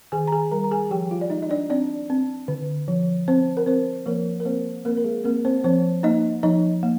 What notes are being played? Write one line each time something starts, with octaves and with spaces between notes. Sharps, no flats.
D#3 G#4 G#5
A#5
G#4 G#5
G3 A#4 A#5
A#5
G#4 G#5
F3 G4 G5
F4 F5
D5
G#3 D#4 D#5
D#5
D4 D5
C4 D4 D5
C4
D3
F3
C4 C5
A#4
C4 C5
F3 A#3 A#4
A#4
A#3 C4 C5
A#3 C4 A#4
A#4
G#3 G#4
A#3 C4 A#4
C4 C5
F3 C4 C5
A#3 D#4 D#5
F3 D#4 D#5
A#3